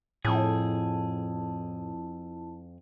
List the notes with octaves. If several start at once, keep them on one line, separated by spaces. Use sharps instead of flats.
F2 A2 E4 G#4 A5